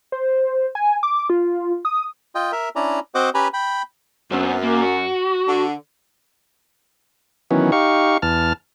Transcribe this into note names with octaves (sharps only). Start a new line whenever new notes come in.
C5
G#5
D6
F4
D#6
F4 D#5 G5
A#4 E5
C#4 D4 E4 D5 A#5
C4 F#4 C5 D#5 F#5 D6
C#4 G4 B4 G#5 A#5 B5
G5 B5
F#2 B3 C4
A#3
F#4
D3
D#3 E3 F#3 B3 C#4
D#4 G4 F5 C#6
E2 A5 F6